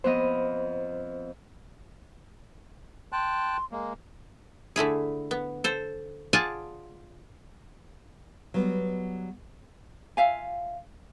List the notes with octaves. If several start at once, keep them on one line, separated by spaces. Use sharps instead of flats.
F2 B3 C5 D#5
G5 A5 C6 F#6
G#3 A#3
D3 A3 E4 G#4
B3
A4 C5
F4 G#4 D5 F#5 G#5 A5
F#3 G3 B3
F4 E5 F5 G#5